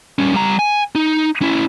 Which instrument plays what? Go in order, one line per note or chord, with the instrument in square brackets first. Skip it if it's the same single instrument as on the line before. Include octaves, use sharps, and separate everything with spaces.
[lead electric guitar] G3 C#4
G3 A#5
G#5
D#4
C#4 E4